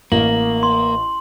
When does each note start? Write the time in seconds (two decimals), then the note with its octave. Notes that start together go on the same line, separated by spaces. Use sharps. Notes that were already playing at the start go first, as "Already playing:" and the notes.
0.12 A1 A#3 F#7
0.63 C6